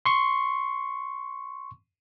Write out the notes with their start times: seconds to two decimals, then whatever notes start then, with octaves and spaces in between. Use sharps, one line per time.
0.06 C6 C#6